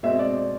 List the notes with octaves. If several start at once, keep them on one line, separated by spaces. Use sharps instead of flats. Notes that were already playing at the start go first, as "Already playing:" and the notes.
B2 G#3 C4 E5
D5
D5